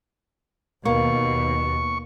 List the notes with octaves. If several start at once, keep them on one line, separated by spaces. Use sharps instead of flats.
D#2 B2 A#3 C#6